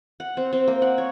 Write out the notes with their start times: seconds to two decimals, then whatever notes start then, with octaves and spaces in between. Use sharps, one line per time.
0.20 F#5
0.37 C4
0.53 C4
0.68 A#3
0.82 F#5
0.98 C#5